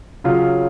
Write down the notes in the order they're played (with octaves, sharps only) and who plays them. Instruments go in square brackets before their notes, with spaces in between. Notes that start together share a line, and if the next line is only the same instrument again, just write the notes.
[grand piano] C#3 F#3 F4